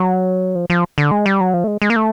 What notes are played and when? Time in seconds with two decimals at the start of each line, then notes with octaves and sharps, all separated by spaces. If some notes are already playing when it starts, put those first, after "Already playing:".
Already playing: F#3
0.55 F3
0.70 F3
0.98 D3
1.11 G#3
1.26 G3
1.41 F#3
1.54 F3
1.64 A3
1.67 G#3
1.82 G#3
1.90 A#3
1.96 A3